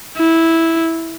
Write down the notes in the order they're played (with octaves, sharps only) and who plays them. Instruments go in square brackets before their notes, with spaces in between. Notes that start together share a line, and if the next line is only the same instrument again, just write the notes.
[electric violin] E4